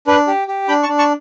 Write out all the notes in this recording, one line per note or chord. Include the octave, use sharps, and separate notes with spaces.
D4 B4
G4
G4
D4 G5 B5
A5 C#6
D4
A5 C#6